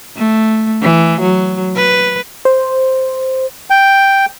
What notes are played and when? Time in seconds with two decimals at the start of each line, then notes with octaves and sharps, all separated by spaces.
0.17 A3
0.82 E3
1.21 F#3
1.76 B4
2.45 C5
3.70 G5